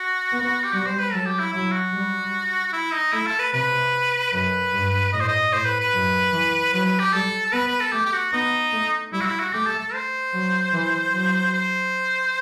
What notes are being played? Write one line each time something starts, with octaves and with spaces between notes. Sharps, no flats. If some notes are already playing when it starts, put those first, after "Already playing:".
Already playing: F#4
B3
G4
G3 F#4
C5
B4
F#3 A4
G4
E4
F#3 E4
F#4
G3
F#4
E4
D#4
A3 E4
A4
B4
C3 B4
F#2 B4
G2
A2 D#5
C5
D#5
A2 C5
B4
B4
F#2
E3
F#3 B4
B4
G4
G3 A4
A4
B3 B4
B4
A4
A3 G4
G4
F#4
B3 D#4
A3
G3 E4
F#4
E4
F#4
A3 G4
A4
A4
C5
F#3
E3
F#3
C5